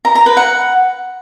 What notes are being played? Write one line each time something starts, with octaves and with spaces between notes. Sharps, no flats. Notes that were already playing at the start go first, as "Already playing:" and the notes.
A#5
A#5
B4
F#5